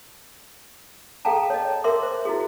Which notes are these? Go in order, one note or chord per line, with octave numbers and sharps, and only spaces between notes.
G#4 A4 F5 G5 A5 A#5
C#5 D#5
A#4 E5 C6 D6
C5
E4 F#4 G#4